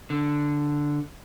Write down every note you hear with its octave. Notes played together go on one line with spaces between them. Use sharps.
D3